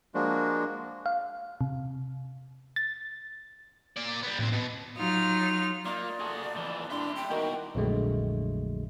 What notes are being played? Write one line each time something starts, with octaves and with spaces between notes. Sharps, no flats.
F3 G#3 A#3 D4 F#4
F5
C3
A6
A#3 D5
G3 B3
D#2 A2 C4
B2
F#3 D#4 F4 F6
A#3 D#4 F4 D5 A#5
A3 A#3 F#4 G#4
F2 E3
G3 D4 E4 E5 C6
G5
D#3 B3 F#4
A#1 F2 D3 F#3 G#3 A3